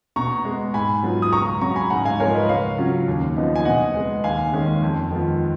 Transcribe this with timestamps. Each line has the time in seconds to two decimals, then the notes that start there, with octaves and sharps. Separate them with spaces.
0.16 B2 A#5 C#6
0.45 G#3 B3
0.74 G#2 G#5 B5
1.03 F#3 B3 F4
1.22 D#6
1.32 C#2 A#5 C#6
1.61 C#3 F#3 A#5 C#6
1.72 A#5
1.76 G#5 B5
1.90 G#2 F#5 A#5
2.05 F5 G#5
2.20 F3 G#3 A#4 C#5
2.34 B4 D#5
2.48 C#2 C#5 F5
2.78 C#3 F#3 C#4 F4
3.07 D#2
3.37 C#3 F3 B3 D#4
3.56 G#5
3.65 B2 D#5 F#5
3.95 G#3 B3
4.24 D#2 F5 G#5
4.53 D#3 G#3 C#4
4.82 F2
5.11 D#3 G#3 B3 F4